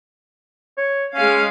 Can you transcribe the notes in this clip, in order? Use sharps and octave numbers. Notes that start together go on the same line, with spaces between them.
C#5
G#3 C#4 F5